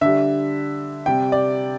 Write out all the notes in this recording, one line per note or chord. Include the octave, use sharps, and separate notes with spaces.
D3 G3 E5
C3 G3 G5
D5